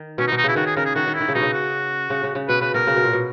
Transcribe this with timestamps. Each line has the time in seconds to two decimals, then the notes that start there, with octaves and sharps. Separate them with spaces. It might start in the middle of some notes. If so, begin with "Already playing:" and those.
Already playing: D#3
0.18 B2 C#4
0.27 D#4
0.32 B2
0.37 D#4
0.44 C#3 E4
0.56 D#3 F#4
0.66 G#4
0.76 C#3 A#4
0.85 G#4
0.95 D#3 F#4
1.07 D#3
1.14 E4
1.21 D#3
1.29 C#3
1.34 B2 D#4
1.42 C#3
1.53 F#4
2.10 C#3
2.24 C#3
2.35 C#3
2.48 B2 B4
2.61 C#3 B4
2.74 B2 A#4
2.87 C#3
2.96 B2
3.04 A#2
3.13 B2